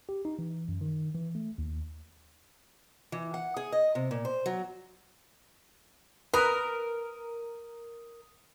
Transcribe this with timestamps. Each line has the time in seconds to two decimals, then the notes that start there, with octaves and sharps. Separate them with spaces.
0.09 G4
0.25 D#4
0.39 E3
0.68 F#2
0.81 D#3
1.14 E3
1.35 A3
1.58 D#2
3.12 E3
3.34 F#5
3.57 G#4
3.72 D#5
3.95 C3
4.11 A#2
4.25 C5
4.46 F#3
6.34 A#4 B4 D#6